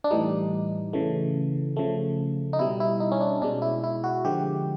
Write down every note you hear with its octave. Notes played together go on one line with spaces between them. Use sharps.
D4
A2 E3 G3 D#4
C#3 E3 A3
C#3 F3 A3
D#4
B2 G3 E4
E4
D#4
C#4
D4
B2 G#3 D4
E4
E4
F#4
D3 F3 G#3 G4